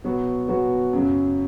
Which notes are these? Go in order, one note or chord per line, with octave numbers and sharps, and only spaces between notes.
B2 F#3 B3 F#4
B2 F#3 B3 F#4
F#2 C#3 F#3